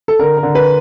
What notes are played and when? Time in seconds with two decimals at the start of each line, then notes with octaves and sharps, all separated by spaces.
0.08 A4
0.19 D3 A#4
0.37 A#4
0.43 D3
0.55 B4